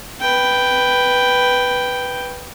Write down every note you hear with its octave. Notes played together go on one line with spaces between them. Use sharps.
B4 G5